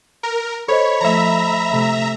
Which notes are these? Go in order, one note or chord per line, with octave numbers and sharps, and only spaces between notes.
A#4
A4 C5 C#5 D#5 B5
F3 A3 E5 A#5
C3 A3